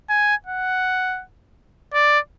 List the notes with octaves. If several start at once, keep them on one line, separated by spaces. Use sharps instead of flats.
G#5
F#5
D5